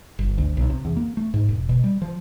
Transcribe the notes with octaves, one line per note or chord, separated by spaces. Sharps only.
G1
D2
B1
C3
E2
A#3
A3
G#2
E1
B2
G3
F3